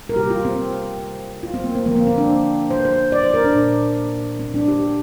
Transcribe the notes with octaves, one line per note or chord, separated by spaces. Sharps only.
A#4
C3 G3 A#3 G4
F4
C4
F4
C4
A#3
C4
D3 F3 A#3
A#3
C4
D4
C5
C5
D5
C5
A#4
D4
A#2
A#3
C4
D4
G4